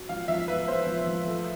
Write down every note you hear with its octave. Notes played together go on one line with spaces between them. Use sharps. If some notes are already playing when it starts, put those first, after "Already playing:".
Already playing: F#4
F3 F5
F3 E5
F3 B4
B3 C5
F3
F3
A3